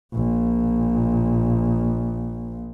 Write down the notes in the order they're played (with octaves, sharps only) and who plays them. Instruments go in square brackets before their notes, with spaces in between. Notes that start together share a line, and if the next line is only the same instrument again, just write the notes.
[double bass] A#1 A#2